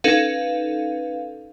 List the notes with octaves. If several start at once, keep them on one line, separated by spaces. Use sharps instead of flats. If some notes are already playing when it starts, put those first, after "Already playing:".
C#4 D#4 A4 B4 F5